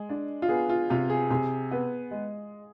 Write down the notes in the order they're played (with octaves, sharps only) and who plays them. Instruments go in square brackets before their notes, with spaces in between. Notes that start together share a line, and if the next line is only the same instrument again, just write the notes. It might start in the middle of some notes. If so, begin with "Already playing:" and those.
Already playing: [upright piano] G#3 [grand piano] G#4
[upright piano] D4
[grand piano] F4
[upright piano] B3 [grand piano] G#4
[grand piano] F4
[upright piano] C3 [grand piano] F4
[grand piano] G#4
[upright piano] C3 [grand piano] G#4
[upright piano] B3
G#3